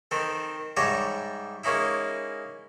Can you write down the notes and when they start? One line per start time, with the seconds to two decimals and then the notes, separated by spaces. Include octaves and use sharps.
0.11 D#3 C4 A4
0.76 G#2 G3 C#5 D5 E5 A#5
1.64 G#3 A#3 C#4 D#4 E4